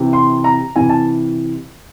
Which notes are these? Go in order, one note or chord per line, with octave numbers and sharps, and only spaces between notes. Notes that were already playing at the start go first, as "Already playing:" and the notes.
Already playing: C3 E3
C6
A#5
C3 E3 G#5
A5